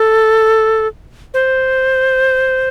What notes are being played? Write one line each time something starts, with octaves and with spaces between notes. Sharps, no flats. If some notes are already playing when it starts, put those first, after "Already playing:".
Already playing: A4
C5